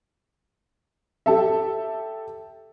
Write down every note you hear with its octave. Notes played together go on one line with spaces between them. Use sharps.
G4 A4 E5